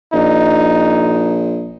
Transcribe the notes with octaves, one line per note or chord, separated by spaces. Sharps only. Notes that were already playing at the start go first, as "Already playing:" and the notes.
A#1 D#4